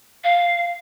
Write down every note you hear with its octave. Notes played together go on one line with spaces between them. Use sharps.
F5